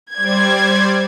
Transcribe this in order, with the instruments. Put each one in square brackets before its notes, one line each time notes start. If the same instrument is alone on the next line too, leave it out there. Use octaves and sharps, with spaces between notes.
[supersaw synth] G3 C5 D5 [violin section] G#6